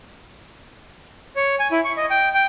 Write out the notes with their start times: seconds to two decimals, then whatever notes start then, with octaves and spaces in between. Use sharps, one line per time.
1.36 C#5
1.59 G#5
1.72 E4
1.84 C#6
1.97 D#5
2.10 G5
2.34 G5